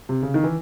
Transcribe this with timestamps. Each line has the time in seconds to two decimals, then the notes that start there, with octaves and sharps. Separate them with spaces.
0.09 C3
0.23 C#3
0.34 D#3
0.44 E3